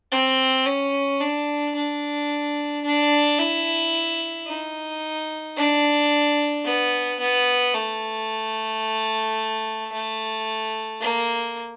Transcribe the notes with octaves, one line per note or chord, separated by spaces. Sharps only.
C4
C#4
D4
D4
D4
E4
D#4
D4
B3
B3
A3
A3
A#3